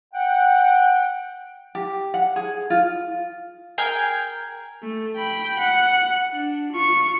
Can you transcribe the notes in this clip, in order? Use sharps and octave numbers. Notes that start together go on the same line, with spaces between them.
F#5 G5
G4
F#5
G#4
F4
G#4 A#4 G5 G#5
A3
G5 B5
F#5
D4
F4 C#6